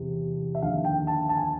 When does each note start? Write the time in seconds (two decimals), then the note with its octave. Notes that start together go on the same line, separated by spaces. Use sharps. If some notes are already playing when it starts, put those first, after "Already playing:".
Already playing: E2 C3
0.55 E5
0.62 D#2 D3 F3 F5
0.84 G5
1.07 A5
1.29 A5
1.37 G#5